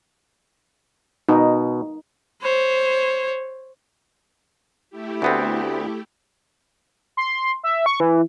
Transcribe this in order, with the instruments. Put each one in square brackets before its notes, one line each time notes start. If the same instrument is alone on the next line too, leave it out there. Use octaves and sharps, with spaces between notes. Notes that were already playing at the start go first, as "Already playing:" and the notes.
[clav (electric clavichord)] B2 [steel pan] D#4
[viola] C5 C#5
[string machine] A3 E4 G4
[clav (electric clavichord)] D2 B3 C4
[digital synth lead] C6
E5
C#6
E3